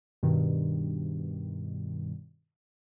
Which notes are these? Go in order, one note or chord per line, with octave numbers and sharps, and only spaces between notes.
G2 B2 D#3 G3